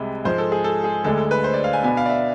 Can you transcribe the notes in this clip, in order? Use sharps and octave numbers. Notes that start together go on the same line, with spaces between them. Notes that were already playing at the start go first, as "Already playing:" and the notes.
Already playing: C2 C3 G#3
G#2 F3 G#3 C5
A4
G#4
A4
G#4
D2 D3 G#3 D4 A4
A4
B4
C5
D5
F5
G#5
B2 B3 D4 G#5
F5
D5
E5